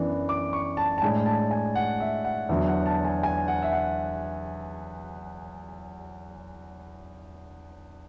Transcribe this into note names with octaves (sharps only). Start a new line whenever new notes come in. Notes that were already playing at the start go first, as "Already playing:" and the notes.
Already playing: F#2 E3 B3 D4
D6
C#6
A5
A5
A2 G#3 D4 G#5
A5
G#5
F#5
E5
F#5
E2 D3 F#3 E5
F#5
A5
G#5
G#5
F#5
E5
F#5